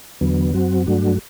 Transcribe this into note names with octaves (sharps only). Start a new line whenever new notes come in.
E2 D3 F#3 B3
F#2 F#3 C4 F#4
G2 F#3 A3 D4 F#4